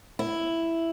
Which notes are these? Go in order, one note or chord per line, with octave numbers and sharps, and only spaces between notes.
E4